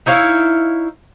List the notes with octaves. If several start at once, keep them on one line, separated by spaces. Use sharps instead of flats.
D#4 E4 C#5 F5